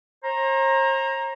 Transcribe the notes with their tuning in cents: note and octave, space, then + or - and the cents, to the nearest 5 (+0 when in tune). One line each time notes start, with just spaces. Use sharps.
C5 +45 A#5 +5